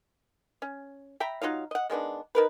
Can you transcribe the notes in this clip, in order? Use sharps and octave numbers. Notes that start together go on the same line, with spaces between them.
C#4
E5 G5 A#5 B5
F#3 D#4 F4 F5
D#5 F#5
D#3 G#3 B3 D4
D#3 A#4 B4